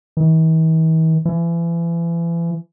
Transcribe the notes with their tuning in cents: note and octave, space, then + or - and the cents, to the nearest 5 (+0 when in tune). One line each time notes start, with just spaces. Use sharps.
E3 -45
E3 +35